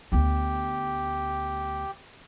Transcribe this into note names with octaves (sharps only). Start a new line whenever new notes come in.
D2 B3 G4